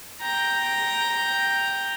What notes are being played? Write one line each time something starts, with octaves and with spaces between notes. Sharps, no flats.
G5 A#5